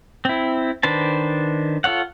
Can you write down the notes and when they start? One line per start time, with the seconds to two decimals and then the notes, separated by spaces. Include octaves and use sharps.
0.25 C4 E4
0.83 D#3 D4 B4 C5 A5
1.84 F4 A4 C#5 F#5